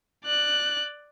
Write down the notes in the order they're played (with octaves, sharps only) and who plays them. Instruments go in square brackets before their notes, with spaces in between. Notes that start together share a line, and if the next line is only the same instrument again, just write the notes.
[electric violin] D5 F#6